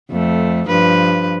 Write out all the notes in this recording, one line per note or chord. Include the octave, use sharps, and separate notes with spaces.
F2 A3
G2 F3 B4